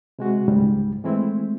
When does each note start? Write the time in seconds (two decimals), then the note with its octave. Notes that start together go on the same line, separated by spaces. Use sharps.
0.19 C3 G#3 F#4
0.48 C#2 G#2 G3
1.04 E3 G#3 A3 C4 E4